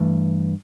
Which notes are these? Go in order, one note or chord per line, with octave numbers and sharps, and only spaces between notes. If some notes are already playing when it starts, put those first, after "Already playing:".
Already playing: G2 E3 A3